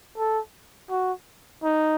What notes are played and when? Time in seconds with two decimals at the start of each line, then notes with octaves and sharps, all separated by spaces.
0.18 A4
0.91 F#4
1.63 D#4